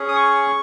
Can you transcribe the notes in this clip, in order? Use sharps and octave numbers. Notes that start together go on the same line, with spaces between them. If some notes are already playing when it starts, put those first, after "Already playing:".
Already playing: C#4 G#4
D#6
C#6